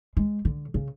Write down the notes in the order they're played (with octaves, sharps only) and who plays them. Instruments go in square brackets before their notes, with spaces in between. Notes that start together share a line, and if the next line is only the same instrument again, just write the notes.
[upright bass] G#3
D3
C#3